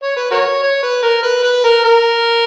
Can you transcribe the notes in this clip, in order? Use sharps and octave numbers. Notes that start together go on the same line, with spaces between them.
C#5
B4
F#4 A#4 C#5
C#5
B4
A#4
B4
B4
A#4
A#4